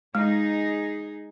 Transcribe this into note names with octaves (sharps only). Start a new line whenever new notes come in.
G#3 D#4 G#4